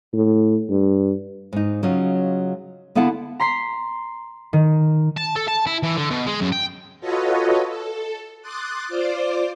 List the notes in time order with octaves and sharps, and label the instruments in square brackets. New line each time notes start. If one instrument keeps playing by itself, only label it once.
[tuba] A2
G2
[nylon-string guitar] G#2 D#4
C#3 F#3 C#4 D#4 F4
D3 B3 E4 F5 F#5 A5
[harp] A#5 C6 B6 C7
D#3
[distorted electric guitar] A5
A4
A5
E4
E3
D3
B2
G#3
F#2
G5
[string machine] F4 F#4 A4 B4 C#5 D#5
A4
C6 D6 D#6 F#6 A6
F4 C5 D5 D6